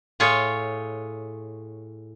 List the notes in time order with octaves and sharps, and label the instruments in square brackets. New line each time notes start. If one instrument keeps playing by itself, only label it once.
[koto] A2 F4 G#4 C#5